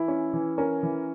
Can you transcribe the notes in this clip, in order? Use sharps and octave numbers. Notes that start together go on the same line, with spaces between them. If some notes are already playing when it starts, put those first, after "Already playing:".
Already playing: E3 E4
C#4
E3
C#4 A#4
E3